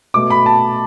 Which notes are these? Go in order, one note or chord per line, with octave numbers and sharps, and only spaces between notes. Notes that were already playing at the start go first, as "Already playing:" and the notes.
B2 A3 D6
B5
A5